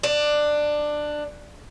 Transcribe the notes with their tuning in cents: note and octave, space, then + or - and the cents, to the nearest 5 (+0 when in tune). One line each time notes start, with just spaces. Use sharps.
D4 +15